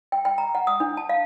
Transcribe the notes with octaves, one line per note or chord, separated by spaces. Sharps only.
G5
G5
A#5
F#5
D#6
D4
A5
F5